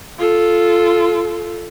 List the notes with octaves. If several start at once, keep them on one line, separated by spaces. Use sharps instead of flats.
F4 A4